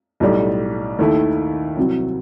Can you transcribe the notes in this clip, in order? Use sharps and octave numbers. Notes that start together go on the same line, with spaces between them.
B1 A2 G3
D#2 D#3 A3 E4
C2 C3 F#3